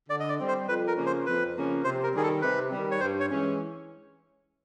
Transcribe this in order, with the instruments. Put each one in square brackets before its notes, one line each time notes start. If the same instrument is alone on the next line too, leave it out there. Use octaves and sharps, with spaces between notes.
[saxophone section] D3 [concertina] D5
[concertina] D#5
D5
[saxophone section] G3 C4
[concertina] C5
[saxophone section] F2 [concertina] B4
[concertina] A#4
[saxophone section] C#3 F3 A#3 C#4
[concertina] C5
[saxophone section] F2 [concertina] B4
[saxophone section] C#3 F3 A#3 C#4
[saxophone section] C3 [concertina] C5
[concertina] A#4
[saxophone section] D#3 G3 [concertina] G#4
[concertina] A4
[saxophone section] C3 [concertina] B4
[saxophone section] D#3 G3
[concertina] C#5
[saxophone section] G2 [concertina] C5
[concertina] C#5
[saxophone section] E3 G#3 C#4